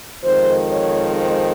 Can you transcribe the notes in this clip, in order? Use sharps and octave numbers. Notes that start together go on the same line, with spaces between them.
F2 D#3 G#3 C5
C#5
C5